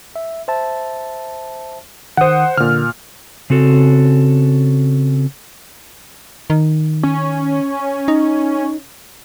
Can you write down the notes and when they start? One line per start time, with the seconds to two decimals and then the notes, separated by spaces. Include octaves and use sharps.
0.16 E5
0.48 C5 E5 A5
2.17 D#3 C5 F#5 D#6
2.57 A#2 D3 F6
3.50 C#3 C4 F#4 A4
6.50 D#3
7.03 C#4
8.08 D#4